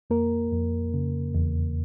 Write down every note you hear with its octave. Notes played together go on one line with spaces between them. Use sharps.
F2 A#3 A#4
F2
C#3
E2